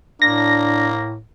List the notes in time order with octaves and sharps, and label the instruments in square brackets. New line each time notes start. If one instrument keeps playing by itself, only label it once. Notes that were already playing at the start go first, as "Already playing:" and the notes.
[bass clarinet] A2 [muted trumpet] A#3 [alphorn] D4 [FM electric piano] A#6